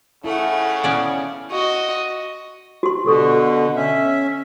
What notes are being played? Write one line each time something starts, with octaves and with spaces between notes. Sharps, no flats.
C#3 A3 E4 F#5
B3 C#4 D5 F5
F#4 D#5
F#4 G4 C6
B2 D3 G4 A4 C#6
C#4 E5